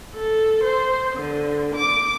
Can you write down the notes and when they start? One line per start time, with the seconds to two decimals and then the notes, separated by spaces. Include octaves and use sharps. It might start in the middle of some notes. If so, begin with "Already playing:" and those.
0.14 A4
0.63 C5
1.16 D3
1.75 D6